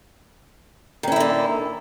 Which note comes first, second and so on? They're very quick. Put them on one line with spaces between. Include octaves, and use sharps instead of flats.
D#3 C#4 E4 A#3 D3